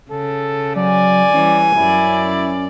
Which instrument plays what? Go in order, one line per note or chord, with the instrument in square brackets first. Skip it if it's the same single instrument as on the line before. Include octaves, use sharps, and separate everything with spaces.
[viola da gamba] C#3 [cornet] A4
[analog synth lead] F#3 [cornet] D5 [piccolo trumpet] G#5
[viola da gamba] E3 G3 [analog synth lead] C#4
[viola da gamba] F#2 D5 [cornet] E4